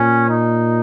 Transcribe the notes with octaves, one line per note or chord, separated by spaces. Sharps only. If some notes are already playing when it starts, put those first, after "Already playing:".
Already playing: A#2 C#4
D#4